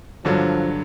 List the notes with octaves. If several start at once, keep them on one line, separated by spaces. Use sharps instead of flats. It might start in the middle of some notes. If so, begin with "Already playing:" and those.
G2 D3 F3 F#3